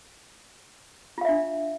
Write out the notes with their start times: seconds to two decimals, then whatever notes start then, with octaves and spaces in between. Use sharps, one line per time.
1.18 F4
1.21 F5
1.25 E5
1.28 D4